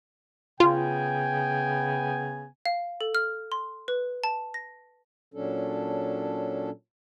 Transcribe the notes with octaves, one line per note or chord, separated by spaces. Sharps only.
C#3 B3 F4 G5 G#5
F5
A4
F6
C6
B4
A5
A#6
A#2 F#3 C#4 D4 A4